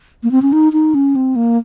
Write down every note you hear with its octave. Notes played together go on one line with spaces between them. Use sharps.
A#3
C4
C#4
D#4
D#4
C#4
C4
A#3